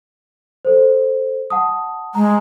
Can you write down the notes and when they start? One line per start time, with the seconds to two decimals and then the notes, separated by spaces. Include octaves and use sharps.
0.65 A4 C5
1.50 F#5 A5 D#6
2.15 G#3 A#5